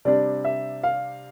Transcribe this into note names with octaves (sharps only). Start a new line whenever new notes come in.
C3 G3 D4 D5
E5
F5